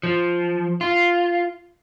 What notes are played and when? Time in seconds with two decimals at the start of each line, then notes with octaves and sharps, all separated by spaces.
0.03 F3
0.81 F4